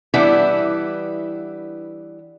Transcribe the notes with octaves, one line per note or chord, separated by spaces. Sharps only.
E3 G3 B3 D4 E4